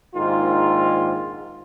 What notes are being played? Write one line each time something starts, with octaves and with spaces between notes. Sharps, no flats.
A#1 G#2 D#3 F4